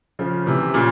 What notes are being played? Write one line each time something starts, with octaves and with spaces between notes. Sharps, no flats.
C#3 F3
C3 E3
A#2 C#3